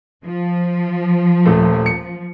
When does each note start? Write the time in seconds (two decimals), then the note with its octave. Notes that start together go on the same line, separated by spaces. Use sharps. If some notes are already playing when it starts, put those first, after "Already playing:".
0.25 F3
1.46 D#1 A3
1.86 C#7